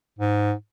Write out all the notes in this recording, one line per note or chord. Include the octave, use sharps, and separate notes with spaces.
G#2